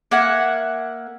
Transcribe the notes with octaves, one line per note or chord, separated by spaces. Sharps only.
A#3 E5 F#5 G#5